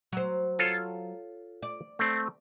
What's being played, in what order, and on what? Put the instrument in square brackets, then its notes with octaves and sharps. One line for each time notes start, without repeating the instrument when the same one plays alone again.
[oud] F#3 C5
[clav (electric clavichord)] F4 A4 C#5
[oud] D5
[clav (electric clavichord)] A3 C4